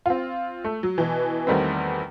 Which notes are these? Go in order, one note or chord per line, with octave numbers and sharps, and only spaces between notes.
C4 F4
A3
F#3
B2 E3
E2 D#3 G3 A3 B3 C4